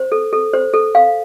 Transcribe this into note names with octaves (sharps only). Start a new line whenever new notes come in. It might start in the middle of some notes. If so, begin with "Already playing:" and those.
Already playing: C5
A4
A4
C5
A4
F5